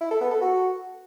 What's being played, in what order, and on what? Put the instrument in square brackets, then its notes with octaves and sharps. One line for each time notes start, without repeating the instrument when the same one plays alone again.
[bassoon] E4
A4
B3
A4
F#4